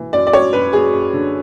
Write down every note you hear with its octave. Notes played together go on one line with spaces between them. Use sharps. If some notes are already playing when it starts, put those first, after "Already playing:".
Already playing: E3
F#2 D5
D5
F#2 C#5
F#2 B4
F#2 G#4
F#2
D3